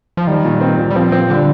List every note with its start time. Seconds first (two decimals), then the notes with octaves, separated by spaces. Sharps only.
0.17 F3
0.27 D#3 G3
0.45 A#2
0.61 C4
0.79 A#2
0.90 G3
0.96 F3 C4
1.12 C4
1.30 D3 G3